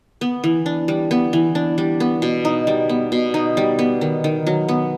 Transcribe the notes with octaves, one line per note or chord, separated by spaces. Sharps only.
B3
E3
D4
G3
B3
E3
D4
G3
B3
B2
D#4
G3
B3
B2
D#4
G3
B3
D#3
D#3
F#3
B3